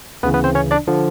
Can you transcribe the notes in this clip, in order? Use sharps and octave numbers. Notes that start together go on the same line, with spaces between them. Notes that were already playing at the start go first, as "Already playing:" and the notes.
D2 C#3 E3 B3 B4
B3 B4
C4 C5
C#4 C#5
D4 D5
D3 F3